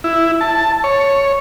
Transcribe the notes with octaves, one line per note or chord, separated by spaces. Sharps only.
E4
A5
C#5